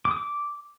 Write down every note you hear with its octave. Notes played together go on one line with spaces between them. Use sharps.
D6
D#6
D6